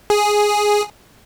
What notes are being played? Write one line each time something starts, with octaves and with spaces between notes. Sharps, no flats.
G#4